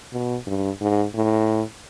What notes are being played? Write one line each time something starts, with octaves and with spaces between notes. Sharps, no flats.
B2
G2
G#2
A2